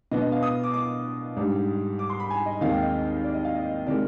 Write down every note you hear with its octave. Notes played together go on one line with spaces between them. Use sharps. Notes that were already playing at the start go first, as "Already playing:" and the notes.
B2 B3 D4 D#5
D#5
F5
D#6
D6
D6
G#2 G3 D4
D6
C6
B5
G#5
D#5
D#2 D#3 G#3 C4 F5
G5
D#5
D5
D#5
F5
D#5
C3 D#3 G#3 D5